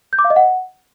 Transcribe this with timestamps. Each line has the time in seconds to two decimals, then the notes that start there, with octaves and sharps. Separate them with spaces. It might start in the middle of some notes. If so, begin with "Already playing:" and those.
0.13 G6
0.19 D6
0.24 F5
0.30 D#5
0.36 F#5